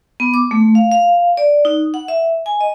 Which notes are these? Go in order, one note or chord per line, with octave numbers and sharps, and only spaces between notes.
B3
D6
A3
F5
F5
D5
D#4
F#5
E5
G#5
D#5